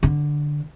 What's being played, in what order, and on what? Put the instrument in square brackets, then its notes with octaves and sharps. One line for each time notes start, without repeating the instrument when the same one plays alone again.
[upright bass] D3